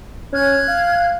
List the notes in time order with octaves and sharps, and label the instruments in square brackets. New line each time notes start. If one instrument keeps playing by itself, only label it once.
[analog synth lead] C#4 [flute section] F6 F#6 G#6
[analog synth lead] F5